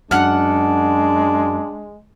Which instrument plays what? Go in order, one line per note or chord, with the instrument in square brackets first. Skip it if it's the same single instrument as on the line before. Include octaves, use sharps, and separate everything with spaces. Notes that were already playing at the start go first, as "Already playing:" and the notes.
[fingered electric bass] F#2 [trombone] G#3 [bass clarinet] D4 [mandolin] F#5 F6